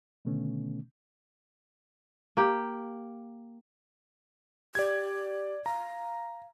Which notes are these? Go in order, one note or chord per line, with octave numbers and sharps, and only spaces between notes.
B2 D3 D#3 A3 B3 C#4
A#3 G4
G4 D5 G#6
F5 A#5